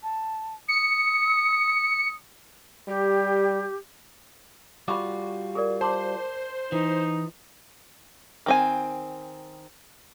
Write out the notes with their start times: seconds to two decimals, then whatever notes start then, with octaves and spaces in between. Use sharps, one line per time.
0.03 A5
0.68 D#6 C#7
2.88 G3 G4
4.88 G3 F4 F#4 B5 C#6 D6
5.55 G#4 A#4 D5
5.81 C5 A5 C6 D6
6.72 E3 D#4
8.46 D#3 C4 G#5